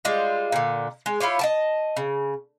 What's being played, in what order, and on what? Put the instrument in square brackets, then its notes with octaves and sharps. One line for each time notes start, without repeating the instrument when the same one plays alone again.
[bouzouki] G3 G#3 F4
A#2 D3
G#3
E4 F4 G4 C#5
D#5 G5 A5
C#3